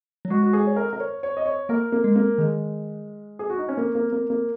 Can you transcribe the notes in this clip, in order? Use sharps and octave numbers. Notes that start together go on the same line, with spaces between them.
F#3
G#3 F#4
F#4
G#4
C#5
A#4
A#4
C#5
C#5
D#5
C#5
A#3 A#4
A#3
G#3
A#3
D#3 G#3
G#4
F#4
D#4
C#4
A#3
A#3
A#3
A#3